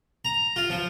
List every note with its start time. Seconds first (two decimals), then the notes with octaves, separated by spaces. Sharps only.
0.25 A#5
0.56 F4
0.70 F3